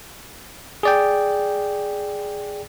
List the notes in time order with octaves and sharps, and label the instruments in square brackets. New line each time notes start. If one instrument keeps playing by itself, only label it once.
[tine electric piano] G#4 D5 G5